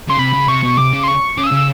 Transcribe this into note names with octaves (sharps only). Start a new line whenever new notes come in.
C#3 C6
C3 B5
C#3
C3 C#6
B2
C3 D6
C#3
C6
C#6
C#3 D6
D#6
E6
C#3
E6